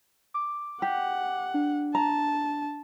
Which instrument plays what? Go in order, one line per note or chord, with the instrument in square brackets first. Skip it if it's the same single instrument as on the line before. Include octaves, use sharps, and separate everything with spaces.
[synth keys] D6
[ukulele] G4 [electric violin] F#5
[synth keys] D4
[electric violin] A5 [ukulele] A#5